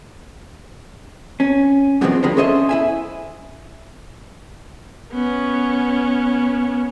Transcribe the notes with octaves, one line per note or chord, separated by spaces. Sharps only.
C#4
G2 B2 D#3 F3 G#3 C4
D3 F3 G3 G#3 A#3
C#4 G#4 A4 C5 D#5 E5
E4 E5 G#5
B3 C#4